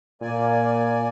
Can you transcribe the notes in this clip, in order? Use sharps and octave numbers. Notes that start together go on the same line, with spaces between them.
A#2 A#3 D5 G#5